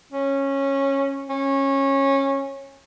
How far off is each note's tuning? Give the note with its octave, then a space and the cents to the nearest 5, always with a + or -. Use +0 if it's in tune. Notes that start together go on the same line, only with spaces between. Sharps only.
C#4 -10
C#4 -20